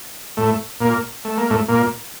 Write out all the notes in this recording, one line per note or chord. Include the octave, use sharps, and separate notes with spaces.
A2 A3
A#2 A#3
A3
A#3
A2 A3
A#2 A#3